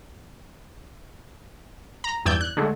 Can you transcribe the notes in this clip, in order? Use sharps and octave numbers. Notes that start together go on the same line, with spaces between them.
A#5
E2 G2 D5 E6 G6 G#6
F#6
D3 G#3 A3